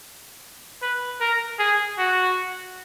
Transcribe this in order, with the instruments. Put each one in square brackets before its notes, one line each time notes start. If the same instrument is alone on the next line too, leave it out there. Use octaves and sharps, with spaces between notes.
[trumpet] B4
A#4
G#4
F#4